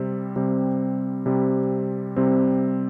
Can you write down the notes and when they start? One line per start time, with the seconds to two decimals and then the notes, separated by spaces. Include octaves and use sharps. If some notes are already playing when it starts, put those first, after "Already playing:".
Already playing: C3 G3 C4
0.36 C3 G3 C4
1.26 C3 G3 C4
2.16 C3 G3 C4